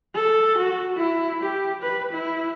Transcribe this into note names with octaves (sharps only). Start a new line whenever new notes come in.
A4
F#4
E4
G4
B4
E4